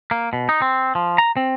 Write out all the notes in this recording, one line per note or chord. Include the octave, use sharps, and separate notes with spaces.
A#3
B2
D#4
C4
F3
A#5
C4